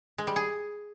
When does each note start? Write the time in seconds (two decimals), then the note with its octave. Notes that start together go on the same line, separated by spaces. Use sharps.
0.18 G#3
0.27 G3
0.36 G#4